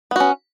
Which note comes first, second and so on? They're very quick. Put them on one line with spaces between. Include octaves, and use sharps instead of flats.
B3 F#4 C#4